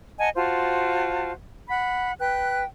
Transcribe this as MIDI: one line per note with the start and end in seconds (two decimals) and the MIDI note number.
0.19 0.29 75
0.19 0.29 78
0.19 0.29 80
0.19 0.29 81
0.35 1.32 65
0.35 1.32 66
0.35 1.32 72
0.35 1.32 81
1.69 2.13 78
1.69 2.13 83
2.20 2.63 71
2.20 2.63 79
2.20 2.63 90